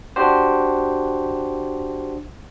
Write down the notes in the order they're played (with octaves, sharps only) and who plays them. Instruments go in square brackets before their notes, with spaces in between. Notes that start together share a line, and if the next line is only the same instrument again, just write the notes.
[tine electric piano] D4 F#4 G4 C5